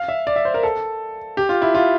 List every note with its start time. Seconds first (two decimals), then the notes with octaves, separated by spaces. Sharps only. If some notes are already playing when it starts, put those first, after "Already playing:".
Already playing: F5
0.08 E5
0.27 D5
0.36 E5
0.45 C5
0.54 A#4
0.63 A4
1.37 G4
1.49 F4
1.62 E4
1.74 F4